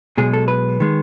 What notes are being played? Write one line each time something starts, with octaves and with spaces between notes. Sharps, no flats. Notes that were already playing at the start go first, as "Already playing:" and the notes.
B1 B2 G#3 G#4
A4
B4
D#3 G#3